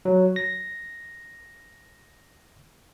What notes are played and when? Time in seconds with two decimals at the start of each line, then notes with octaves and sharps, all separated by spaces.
0.05 F#3
0.36 A#6